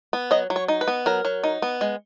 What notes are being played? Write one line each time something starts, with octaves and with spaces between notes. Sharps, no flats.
B3
F#3 D#5
F#3
C#5
D#4
B4
B3
F#3 A#4
F#3
D#4
B3
G#3